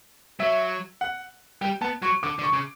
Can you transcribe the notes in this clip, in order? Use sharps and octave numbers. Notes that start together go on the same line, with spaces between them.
F#3 E5
F#5
G3 G5
B3 A5
F#3 C#6
D3 D6
D3
C#6
C#3